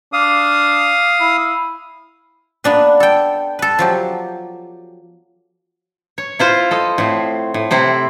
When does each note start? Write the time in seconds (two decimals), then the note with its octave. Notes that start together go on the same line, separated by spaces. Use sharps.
0.13 D4 F5 D#6
1.20 E4
2.64 A#3 B3 D4 B4
3.00 A4 G5
3.59 A4 B4
3.79 F3 F#3 G4
6.18 C#5
6.39 E4 F4 C5 F5
6.71 A4 D#5
6.98 A2 C4
7.54 A2
7.71 C3 C4 E4